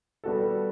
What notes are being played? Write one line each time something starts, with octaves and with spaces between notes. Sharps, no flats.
G3 B3 F#4 A4